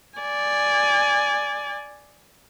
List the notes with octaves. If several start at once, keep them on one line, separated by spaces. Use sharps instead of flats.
D5 G#5